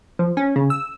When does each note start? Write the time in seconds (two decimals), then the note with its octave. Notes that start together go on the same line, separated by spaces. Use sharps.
0.19 F3
0.37 C#4
0.56 C#3
0.70 E6